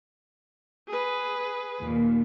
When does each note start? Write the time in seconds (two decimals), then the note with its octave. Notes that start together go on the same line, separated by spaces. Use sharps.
0.88 G#4 B4
1.81 D#2 A#2